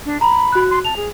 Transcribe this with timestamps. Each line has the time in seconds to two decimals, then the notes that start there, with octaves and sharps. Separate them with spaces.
0.05 D4
0.21 A#5 B5
0.52 F#4 F#6
0.70 C6
0.85 A5 F7
0.96 G#4